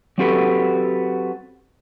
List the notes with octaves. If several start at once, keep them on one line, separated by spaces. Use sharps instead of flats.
F#3 C4 F#4 G4 A4 B4